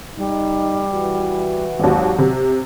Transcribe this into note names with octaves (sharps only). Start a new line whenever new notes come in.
G3 D#4
E3 F#4
G#1 D#2 F#3
C3